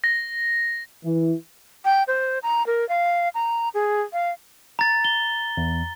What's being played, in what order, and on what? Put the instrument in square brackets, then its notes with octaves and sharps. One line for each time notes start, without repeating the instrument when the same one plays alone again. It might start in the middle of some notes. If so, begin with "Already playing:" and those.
[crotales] A#6
[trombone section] E3
[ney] G5
C5
A#5
A#4
F5
A#5
G#4
F5
[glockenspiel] A#5 A6
G7
[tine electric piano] E2